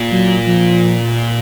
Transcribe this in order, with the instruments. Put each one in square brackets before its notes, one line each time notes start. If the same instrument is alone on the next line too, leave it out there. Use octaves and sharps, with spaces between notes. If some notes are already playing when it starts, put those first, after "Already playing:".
Already playing: [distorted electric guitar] A#2
[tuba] F#3
F3